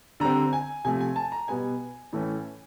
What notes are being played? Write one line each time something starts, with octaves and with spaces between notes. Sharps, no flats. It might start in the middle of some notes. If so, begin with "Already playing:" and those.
D3 G3 C4 A#5
G#5
C3 F3 A3 G#5
G#5
A5
A#5
B2 G3 B3 G#5
A2 E3 A3 C#4